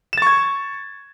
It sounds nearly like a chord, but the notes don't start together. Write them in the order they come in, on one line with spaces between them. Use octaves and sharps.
E7 A6 C#6 G#6